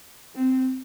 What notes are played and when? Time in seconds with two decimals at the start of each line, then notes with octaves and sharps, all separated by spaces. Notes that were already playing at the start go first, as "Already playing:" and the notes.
0.35 C4